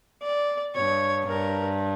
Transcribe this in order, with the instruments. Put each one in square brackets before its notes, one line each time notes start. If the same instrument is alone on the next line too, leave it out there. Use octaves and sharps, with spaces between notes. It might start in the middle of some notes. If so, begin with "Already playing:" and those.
[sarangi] D5
[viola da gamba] G2 [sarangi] C#5
[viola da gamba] G2 [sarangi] A#4